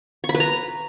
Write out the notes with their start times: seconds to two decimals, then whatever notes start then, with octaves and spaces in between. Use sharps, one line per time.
0.24 C#6
0.29 B5
0.35 B4
0.40 A#5